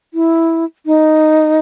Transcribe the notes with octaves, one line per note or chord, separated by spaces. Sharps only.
E4
D#4